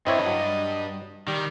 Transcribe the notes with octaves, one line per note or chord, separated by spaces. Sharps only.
G2 C4 E4 C#5 D#5
F#3
D#3 G3